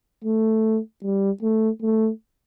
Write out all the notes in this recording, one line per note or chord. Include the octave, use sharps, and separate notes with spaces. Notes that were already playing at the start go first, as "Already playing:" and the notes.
A3
G3
A3
A3